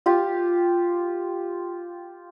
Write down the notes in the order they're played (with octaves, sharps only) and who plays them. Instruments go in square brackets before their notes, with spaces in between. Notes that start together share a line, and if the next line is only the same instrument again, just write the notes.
[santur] F4 G4